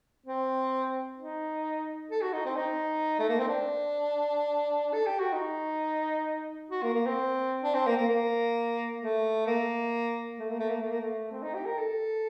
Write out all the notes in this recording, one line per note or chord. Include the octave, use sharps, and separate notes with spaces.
C4
D#4
A4
F#4
D#4
C4
D#4
A3
A#3
C4
D4
A4
G4
F#4
D#4
F#4
A#3
A#3
C4
D4
C4
A#3
A#3
A#3
A3
A#3
A3
A#3
A3
A#3
A3
A#3
A3
C4
D#4
G4
A#4
A4